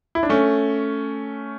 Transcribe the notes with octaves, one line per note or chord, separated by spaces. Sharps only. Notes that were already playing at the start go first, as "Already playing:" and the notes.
E4
D4
A3 C#4